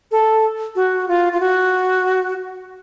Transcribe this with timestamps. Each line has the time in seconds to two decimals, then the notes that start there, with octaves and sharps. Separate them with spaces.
0.11 A4
0.76 F#4
1.08 F4
1.33 F4
1.40 F#4